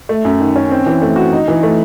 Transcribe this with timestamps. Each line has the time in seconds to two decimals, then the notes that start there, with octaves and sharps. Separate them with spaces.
0.09 A3
0.25 F#2
0.39 D#3
0.56 C#4
0.71 C4
0.86 E3
1.02 A3
1.16 F#4
1.33 D#4
1.48 E3
1.63 A3